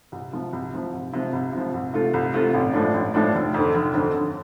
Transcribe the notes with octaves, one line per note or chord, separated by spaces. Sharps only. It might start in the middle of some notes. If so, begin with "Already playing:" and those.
C2
C3 F3
C2
C3 F3
C2
C3 F3
C2
C3 F3
C2
C3 A3 F4
C2
C3 A3 F4
A1
A2 F3 A3 D4
A1
A2 F3 A3 D4
F1
F2 D3
F1
F2 D3
G1